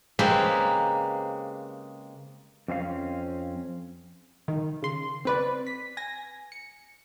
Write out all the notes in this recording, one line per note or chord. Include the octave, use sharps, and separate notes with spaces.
C#3 G#3 A#3 C4 G4 B4
F2 C4 C#4 F5
D#3
C#3 C6
C4 B4 D5
B6
G#5 A#6
C#7